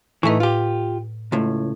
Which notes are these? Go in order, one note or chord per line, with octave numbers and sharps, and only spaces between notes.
A2 E3 A3 D#4 B4
F4 G4
C#2 A2